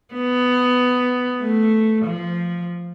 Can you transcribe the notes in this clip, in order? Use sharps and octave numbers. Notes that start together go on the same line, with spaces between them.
B3
A3
F3